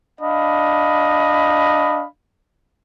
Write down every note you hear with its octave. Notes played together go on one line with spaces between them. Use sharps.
D4 D#5 F5 B5